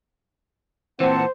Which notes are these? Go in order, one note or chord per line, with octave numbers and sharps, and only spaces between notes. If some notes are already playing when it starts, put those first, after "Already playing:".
A#2 E3 C4 C5 F#5 A5